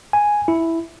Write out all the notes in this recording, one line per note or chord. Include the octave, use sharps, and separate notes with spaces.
G#5
E4